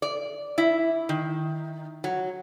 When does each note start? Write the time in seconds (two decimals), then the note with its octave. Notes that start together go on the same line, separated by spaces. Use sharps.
0.02 D5
0.58 E4
1.09 D#3
2.04 F#3